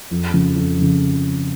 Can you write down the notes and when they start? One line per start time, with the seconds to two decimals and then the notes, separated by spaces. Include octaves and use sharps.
0.11 F2
0.34 C#3 F3
0.56 F2
0.78 C#3 F3